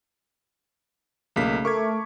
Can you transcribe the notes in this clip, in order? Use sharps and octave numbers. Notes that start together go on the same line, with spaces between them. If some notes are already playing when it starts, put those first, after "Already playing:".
B1 C#3 A3 A#3 B6
A3 A#4 C#6 D6 G#6